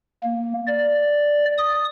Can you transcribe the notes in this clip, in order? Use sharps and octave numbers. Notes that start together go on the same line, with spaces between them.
A#3
D5
D#6